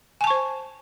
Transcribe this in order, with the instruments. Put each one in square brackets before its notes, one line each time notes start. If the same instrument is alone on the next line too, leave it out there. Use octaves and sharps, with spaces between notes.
[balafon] G#5
A5
C#6
C5